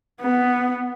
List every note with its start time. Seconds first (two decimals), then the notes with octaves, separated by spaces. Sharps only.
0.21 B3